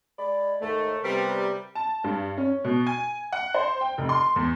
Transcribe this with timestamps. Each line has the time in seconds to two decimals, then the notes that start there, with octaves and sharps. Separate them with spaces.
0.19 G#3 D5 B5
0.62 D#2 G#2 A3
1.03 C3 G3 B3 C4 A#4
1.75 A5
2.04 G2
2.37 C#4
2.64 B2
2.87 G#5
3.32 F#5
3.54 C5
3.81 G5
3.98 F1
4.09 C6
4.36 E2